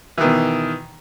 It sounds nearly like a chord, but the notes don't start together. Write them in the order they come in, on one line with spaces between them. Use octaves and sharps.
E3 D#3 B2